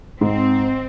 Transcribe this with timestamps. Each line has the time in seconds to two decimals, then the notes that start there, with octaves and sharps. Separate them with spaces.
0.21 G#2 C4